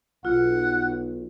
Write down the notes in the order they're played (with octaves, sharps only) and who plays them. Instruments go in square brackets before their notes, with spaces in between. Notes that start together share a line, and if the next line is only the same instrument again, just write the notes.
[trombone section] B1 [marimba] F4 [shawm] F#5